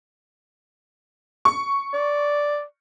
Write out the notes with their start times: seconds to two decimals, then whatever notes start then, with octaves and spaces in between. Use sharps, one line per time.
1.45 C#6
1.94 D5